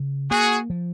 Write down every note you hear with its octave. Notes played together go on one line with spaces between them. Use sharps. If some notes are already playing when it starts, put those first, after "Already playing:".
Already playing: C#3
A#3 F#4 G#4
F3